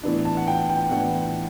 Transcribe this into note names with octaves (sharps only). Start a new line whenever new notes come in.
A2 E3 B3 D4
A5
F#5
G5
G5
A2 E3 B3 D4 F#5